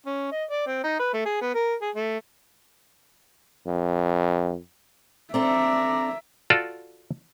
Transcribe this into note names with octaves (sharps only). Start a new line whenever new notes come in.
C#4
D#5
D5
C4
D#4
B4
A3
G#4
B3
A#4
G#4
A3
F2
C4 D4 A4 D5 E5 A#5
F4 F#4 A4 D5